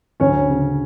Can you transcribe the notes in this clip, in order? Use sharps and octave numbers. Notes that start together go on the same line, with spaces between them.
D2 C#4 C#5
C#3